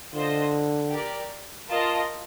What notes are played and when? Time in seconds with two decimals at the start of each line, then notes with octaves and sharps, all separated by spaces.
0.14 D3 F4 C5 D#5
0.91 G4 A#4 D5
1.69 F4 A#4 D#5 A5